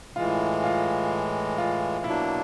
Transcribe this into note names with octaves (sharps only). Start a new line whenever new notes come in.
A2 E3 G#3 F4
F4
F4
B2 F#3 A#3 D4 E4